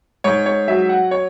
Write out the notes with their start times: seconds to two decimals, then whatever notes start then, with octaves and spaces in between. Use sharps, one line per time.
0.24 G#2 C#5
0.46 C#5
0.68 F#3 E5
0.89 F#5
1.11 C#5